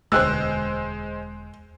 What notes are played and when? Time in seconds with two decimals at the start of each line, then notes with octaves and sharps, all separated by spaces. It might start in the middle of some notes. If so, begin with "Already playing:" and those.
0.12 E1 D2 G#3 C5 E6 F#6